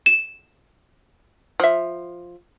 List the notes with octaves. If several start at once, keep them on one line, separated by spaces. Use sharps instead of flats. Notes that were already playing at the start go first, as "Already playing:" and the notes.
E7
F3 E5